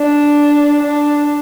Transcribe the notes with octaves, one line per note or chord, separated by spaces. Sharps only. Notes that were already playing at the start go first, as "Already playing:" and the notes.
Already playing: D4
D4